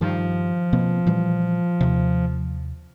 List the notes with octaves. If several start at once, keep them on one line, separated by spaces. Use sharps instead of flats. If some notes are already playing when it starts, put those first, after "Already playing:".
G2 D#3 F3
B2 A#3 C4
A#2 E3 G3
D#2 C3